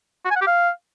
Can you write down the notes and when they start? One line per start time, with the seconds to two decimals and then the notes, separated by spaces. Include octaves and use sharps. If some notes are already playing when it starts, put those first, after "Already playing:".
0.25 F#4
0.30 G#5
0.36 F#5
0.41 G4
0.47 F5